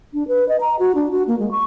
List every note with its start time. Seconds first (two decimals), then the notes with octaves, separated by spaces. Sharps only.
0.14 D4
0.28 B4
0.49 D#5
0.61 A#5
0.79 F#4
0.95 D4
1.11 F#4
1.28 A#3
1.39 G#3
1.51 C#6